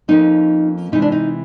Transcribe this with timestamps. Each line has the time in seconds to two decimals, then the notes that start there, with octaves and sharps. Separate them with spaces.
0.08 F2 C3 F3 A#3 C#4 D#4
0.92 C3 E3 G#3 D#4
1.02 D4
1.12 D#4